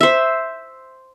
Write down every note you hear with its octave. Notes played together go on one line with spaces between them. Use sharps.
C5 E5